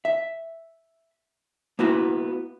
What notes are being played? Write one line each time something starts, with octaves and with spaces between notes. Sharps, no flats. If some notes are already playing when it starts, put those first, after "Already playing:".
E5
A#3 B3 E4 F#4